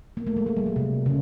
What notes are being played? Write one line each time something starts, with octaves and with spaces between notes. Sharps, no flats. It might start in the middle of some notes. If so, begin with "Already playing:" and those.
A#3
A3
G#3
G#3
G3
F#3
C3
C#3